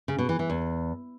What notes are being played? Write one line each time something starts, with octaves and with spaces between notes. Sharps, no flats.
C#3
B2
E3
E3
E2